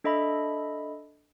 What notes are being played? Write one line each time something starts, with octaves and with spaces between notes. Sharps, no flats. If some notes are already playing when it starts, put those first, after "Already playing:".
D4 A4 D#5 E5 B5